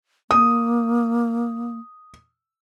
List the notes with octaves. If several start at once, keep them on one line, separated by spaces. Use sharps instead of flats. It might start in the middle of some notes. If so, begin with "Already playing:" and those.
A#3 D#6